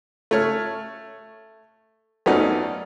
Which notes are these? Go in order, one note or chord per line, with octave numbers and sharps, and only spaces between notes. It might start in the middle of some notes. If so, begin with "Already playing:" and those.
A3 C#5 F6
F#2 A3 B3 C#4 D#4 D5